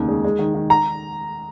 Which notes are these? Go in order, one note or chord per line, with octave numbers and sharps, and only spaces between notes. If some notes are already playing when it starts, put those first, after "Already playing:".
Already playing: F1 D#2 C#3
G#3
G#3
D#3
D#3
A#5